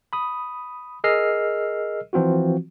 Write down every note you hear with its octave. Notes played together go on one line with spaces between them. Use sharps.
B5 D#6
G#4 A#4 D#5 E6 F6 C7
E3 F3 C4 F4 F#4